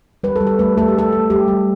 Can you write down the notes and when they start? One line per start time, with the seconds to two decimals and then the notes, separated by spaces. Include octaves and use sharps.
0.23 G3 B4
0.36 A4
0.41 G3
0.47 A4
0.59 A3 B4
0.77 A3 A4
0.88 G4
0.94 A3 A4
1.12 A3
1.30 G3 G4
1.48 G3